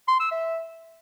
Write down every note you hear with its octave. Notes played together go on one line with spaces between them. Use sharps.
C6
E6
E5